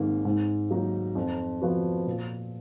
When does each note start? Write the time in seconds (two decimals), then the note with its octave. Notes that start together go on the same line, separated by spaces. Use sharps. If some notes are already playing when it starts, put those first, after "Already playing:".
Already playing: G#1 G#2 D#3 A#3
0.25 G#2
0.70 F#3 A#3 D#4 A#4
1.15 F2
1.62 F3 B3 F#4
2.06 A#2